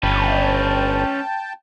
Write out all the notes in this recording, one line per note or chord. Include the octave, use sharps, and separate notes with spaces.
G1 C#4 B4 G5 A5